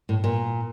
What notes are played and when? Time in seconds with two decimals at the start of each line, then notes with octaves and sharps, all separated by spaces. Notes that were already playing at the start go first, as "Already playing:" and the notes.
0.09 A2
0.24 A#2